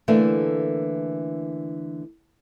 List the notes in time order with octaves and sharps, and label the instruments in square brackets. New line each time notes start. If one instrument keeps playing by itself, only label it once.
[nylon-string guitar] D3 E3 A3 A#3 D4